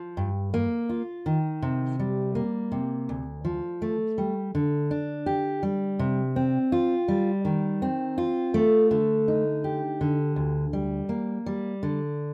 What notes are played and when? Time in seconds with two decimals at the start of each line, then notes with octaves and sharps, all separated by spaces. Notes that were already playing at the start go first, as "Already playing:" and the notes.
Already playing: F3
0.17 G2
0.54 A#3
0.89 F4
1.26 D#3
1.62 C3
1.99 G3
2.35 A#3
2.72 C3
3.09 D2
3.45 F3
3.82 A3
4.18 G3
4.55 D3
4.91 D4
5.26 G4
5.63 G3
5.99 C3
6.36 C4
6.72 F4
7.08 G3
7.45 D#3
7.82 C4
8.18 F4
8.54 A3
8.91 D3
9.28 D#4
9.64 G4
10.01 D3
10.36 D2
10.73 G3
11.09 A#3
11.46 G3
11.83 D3